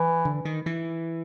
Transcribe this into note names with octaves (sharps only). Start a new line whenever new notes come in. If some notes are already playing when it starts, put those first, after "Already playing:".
Already playing: E3
D3
D#3
E3